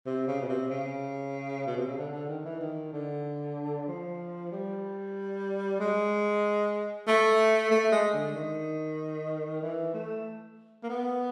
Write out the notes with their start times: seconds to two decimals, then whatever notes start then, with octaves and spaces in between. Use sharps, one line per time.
0.06 C3
0.27 C#3
0.42 B2
0.49 C3
0.70 C#3
1.67 B2
1.77 C3
1.87 C#3
1.97 D3
2.13 D3
2.29 D#3
2.45 E3
2.61 D#3
2.93 D3
3.88 F3
4.52 G3
5.80 G#3
7.07 A3
7.71 A3
7.92 G#3
8.13 D3
8.35 D#3
9.62 E3
9.94 A3
10.83 A#3
10.89 B3